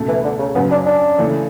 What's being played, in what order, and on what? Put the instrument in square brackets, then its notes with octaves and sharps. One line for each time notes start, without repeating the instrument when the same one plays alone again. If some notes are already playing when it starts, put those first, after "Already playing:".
Already playing: [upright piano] C#2 B2 A3
[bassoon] E3
D3
C#3
[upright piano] F#2 C#3 F#3 C#4 [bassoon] B3
[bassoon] D4
D4
[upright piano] C#3 E3 A3